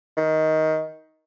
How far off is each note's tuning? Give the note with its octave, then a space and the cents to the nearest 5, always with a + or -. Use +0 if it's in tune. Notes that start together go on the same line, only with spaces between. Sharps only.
D#3 +15